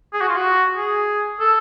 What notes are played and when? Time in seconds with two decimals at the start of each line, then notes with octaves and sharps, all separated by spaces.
0.13 G#4
0.21 F#4
0.28 F4
0.36 F#4
0.76 G#4
1.40 A4